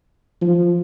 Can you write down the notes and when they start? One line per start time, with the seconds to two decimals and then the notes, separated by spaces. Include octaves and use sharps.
0.41 F3